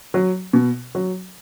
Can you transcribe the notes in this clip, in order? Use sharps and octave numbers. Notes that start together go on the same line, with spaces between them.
F#3
B2
F#3